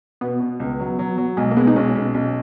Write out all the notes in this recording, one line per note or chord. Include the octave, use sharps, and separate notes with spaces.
B2 B3
B2
C#2
F#3
F#3
F#3
B1 G#3
A#3
G#3 B3
D#4
B1 C#4
B1
B1